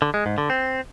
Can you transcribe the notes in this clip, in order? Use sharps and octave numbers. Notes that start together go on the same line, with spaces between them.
D3
G#3
G#2
D3
C4